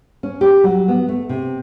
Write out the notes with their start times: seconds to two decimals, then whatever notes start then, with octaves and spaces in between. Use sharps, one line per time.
0.23 C#4
0.41 G4
0.64 F#3
0.88 B3
1.09 A3
1.29 C3